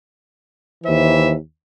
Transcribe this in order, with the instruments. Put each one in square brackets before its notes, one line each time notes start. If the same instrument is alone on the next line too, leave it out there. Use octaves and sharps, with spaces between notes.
[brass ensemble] D#2 E3 C5 E5